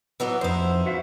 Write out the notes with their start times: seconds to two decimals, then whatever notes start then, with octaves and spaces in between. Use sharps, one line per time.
0.20 E3 F#3 B3
0.41 F2 D#4 E4 C5
0.86 F#4 E5 F5